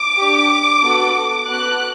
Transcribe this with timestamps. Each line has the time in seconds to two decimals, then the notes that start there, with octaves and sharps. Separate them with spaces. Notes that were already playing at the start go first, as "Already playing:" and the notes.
Already playing: D6
0.17 G4
0.23 D4
0.83 B3 F#4 A4
1.47 B3 F#4 A4 F#6